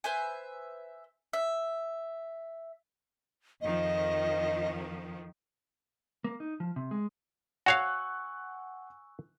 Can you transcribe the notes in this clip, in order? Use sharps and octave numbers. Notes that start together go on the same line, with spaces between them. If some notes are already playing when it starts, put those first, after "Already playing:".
B4 C5 E5 G#5
E5
F2 D#3 F3 D#5
A#3
D#4
F3
C3
G#3
F#4 C#5 F5 F#5 G#5 C#6 E6 F#6